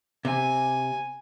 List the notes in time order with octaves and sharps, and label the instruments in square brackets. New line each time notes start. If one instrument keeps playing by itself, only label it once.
[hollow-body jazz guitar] C3 [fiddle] G#5